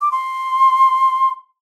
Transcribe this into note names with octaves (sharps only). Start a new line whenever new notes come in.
D6
C6